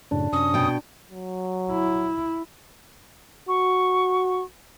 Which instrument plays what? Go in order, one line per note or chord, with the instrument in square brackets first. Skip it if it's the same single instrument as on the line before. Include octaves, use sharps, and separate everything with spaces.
[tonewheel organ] F#2 A2 C#3 [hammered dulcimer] D4
[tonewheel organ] F#2 C3 C#4 [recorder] D#6
[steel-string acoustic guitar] B2 G5
[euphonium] F#3
[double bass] E4
[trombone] F#4 [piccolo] C#6